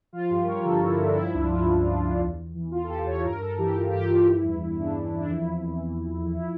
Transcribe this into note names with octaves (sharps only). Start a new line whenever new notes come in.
F3 F4
G2 G4
A#4
G2 C#5
D3 A4
F3 E4
G2 D4
F3 E4
C#2 D4
F4
C#2 E4
C#3
F3
C#2
E2
E2
E3
E3 F4
A4
E2 G4
E2 C#5
G2 A#4
G2 A4
E3 G4
E3 F4
G2 G4
G2 F4
E3 E4
E2
E2
C#3 D4
E3
E2
D4
F2 E4
F2
E3
E3
F2
F2
F3 E4